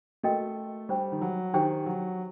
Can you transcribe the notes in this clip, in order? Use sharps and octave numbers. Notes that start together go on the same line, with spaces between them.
A3 F#4 A#4 D#5 G5
G3 D4 G4 C5 G5
D#3
F#3
D#3 D4 G4 C5 G5
F#3